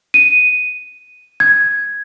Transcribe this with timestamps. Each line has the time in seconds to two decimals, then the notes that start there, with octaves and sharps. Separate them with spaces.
0.14 D#7
1.40 G#6